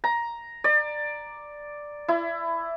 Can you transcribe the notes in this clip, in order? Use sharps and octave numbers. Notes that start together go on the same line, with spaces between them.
A#5
D5
E4